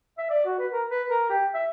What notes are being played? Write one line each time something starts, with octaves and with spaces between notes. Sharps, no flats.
E5
D5
F#4
B4
A#4
B4
A#4
G4
E5